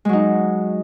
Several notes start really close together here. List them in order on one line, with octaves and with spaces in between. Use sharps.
G#3 F#3 D#4